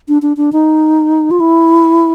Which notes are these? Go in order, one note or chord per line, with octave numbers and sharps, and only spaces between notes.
D4
D4
D4
D#4
F4
E4